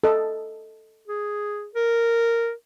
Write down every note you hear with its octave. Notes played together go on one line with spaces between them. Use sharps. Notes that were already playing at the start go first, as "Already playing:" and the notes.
A4 D#5
G#4
A#4